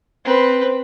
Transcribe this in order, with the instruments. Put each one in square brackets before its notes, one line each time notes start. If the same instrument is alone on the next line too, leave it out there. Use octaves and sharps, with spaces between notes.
[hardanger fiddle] C4 B4